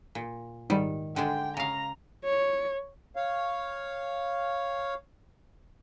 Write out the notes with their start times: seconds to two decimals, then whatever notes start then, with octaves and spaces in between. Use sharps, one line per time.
0.15 A#2
0.70 G#2 D#3 G3
1.16 D3 G#3 D4 G5
1.57 C#3 F5 A#5
2.24 C#5
3.16 C#5 F5